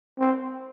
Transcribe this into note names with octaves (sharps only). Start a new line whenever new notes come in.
C4